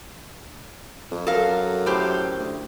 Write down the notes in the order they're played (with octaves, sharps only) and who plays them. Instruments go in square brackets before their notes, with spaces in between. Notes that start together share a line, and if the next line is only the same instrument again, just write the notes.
[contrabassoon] F2
[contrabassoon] F#2 [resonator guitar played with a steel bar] A4 A#4 F5
[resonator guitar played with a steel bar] A2 G4 C5
[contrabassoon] D2